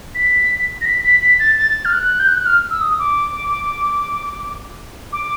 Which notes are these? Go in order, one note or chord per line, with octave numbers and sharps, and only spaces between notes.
B6
A#6
B6
B6
B6
A6
A6
F6
F#6
G6
F#6
F#6
F6
E6
D#6
D6
D6